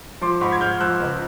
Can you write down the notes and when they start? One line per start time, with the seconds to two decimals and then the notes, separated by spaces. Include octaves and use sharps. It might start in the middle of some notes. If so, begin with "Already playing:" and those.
0.21 F3 C6 D6
0.41 G#2 B5 C#6
0.52 G#6
0.61 G#2 F6 G6
0.80 F3 E6 F#6
1.00 C#2